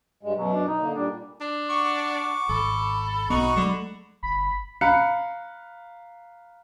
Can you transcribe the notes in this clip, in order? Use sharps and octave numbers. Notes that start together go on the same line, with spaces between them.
G2 G#3
F#2 B2 F#3
D4
D#4
D3 A#3
A#2 G3 D4
D4
F#5 C#6 D6
G#1 A4 B5
B1 B3 D#4 F#4 C#6
D3 F#3 G#3 A3
G1 B5
F5 A#5 B5 F#6 C#7